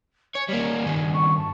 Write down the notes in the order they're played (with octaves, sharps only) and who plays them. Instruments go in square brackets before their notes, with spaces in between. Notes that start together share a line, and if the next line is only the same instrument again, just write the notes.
[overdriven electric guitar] C#5 [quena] G#5
[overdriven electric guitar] G3 A#3
G2 D#3
[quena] C#6
A5